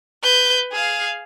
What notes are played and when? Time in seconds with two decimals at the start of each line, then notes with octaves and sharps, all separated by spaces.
0.23 B4 G6
0.72 G#4 F5